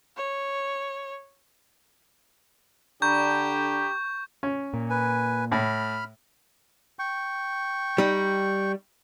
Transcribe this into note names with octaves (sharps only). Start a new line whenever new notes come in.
C#5
D3 D4 G4 A#5 B5 C#6 G6
C#4
A#2
B4 G#5
A2 B5 F6
G5 C#6
G3 D#4